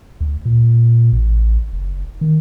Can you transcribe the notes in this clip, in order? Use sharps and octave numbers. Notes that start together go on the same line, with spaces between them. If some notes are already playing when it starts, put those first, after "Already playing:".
D2
A#2
A1
F#1
D#3